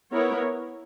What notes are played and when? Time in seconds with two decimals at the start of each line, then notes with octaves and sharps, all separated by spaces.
0.11 B3 E4 A#4 C#5